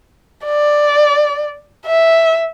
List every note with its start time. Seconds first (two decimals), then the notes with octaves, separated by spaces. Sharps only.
0.45 D5
1.86 E5